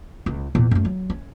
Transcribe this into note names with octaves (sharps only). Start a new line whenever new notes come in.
C#2
E2 A#2
F#2 A3
F#3
C#4